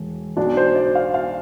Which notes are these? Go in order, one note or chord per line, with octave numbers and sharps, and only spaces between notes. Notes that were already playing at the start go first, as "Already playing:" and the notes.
Already playing: E1
B1 B2 D4
C5
D5
F5
F5